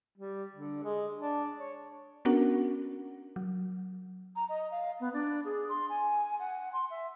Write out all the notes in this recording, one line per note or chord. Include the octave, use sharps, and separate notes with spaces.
G3
D3
G#3
D4
C#5
B3 C#4 D4 F#4 A#4 F#5
F#3
A#5
D#5
F5
B3
D4
G#4
C6
G#5
F#5
C6
E5